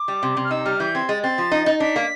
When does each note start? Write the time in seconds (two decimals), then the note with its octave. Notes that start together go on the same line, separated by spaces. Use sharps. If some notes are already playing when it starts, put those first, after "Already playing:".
Already playing: D6
0.08 G3
0.23 C3
0.37 C3
0.44 F6
0.51 D#4 E6
0.65 G3 F6
0.80 E3 G6
0.94 C4 G#6
1.08 G#3 A6
1.23 C4 A6
1.38 F3
1.51 D#4
1.66 D#4
1.80 D4 B6
1.96 A#3